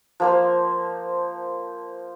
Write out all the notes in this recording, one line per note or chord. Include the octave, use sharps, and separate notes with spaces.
F3 A#3 C5